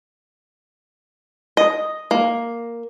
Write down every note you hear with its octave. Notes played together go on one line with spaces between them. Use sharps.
D#5
A#3